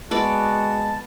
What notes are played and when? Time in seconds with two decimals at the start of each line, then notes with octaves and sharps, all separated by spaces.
0.11 G#3 B3 F#4 D5 A5